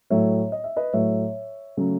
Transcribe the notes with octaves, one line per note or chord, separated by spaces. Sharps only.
A2 F#3 A3 C#5 E5
D#5
E5
B4 D#5
A2 F#3 A3 C#5 E5
C#3 F#3 A3